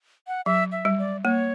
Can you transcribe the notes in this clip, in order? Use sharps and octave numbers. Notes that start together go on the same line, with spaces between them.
F#5
F#3 E5
E5
G3
D5
A#3 C#5